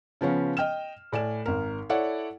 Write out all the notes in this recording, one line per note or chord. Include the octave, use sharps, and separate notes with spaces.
C#3 F3 B3 C#4
D#5 G5 F6 E7
A2 D5 G#5 E7
G#1 A#4
E4 A4 C#5 D5 F#5